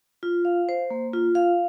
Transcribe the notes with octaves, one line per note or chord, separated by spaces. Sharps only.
F4
F5
C5
A#3
F4
F5